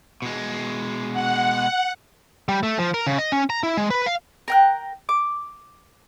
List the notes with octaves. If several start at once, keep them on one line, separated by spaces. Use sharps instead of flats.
B2 G#3
F#5
G3
A3
F3
A#4
C#3
D#5
C#4
A#5
E4
G#3
B4
F5
A#4 G5 F#6
D6